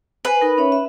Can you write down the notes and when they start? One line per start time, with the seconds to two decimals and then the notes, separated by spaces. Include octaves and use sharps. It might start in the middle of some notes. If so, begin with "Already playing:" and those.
0.25 B4 C5 G#5
0.41 D#4 A#4
0.58 C#4 C#5 E5
0.72 E5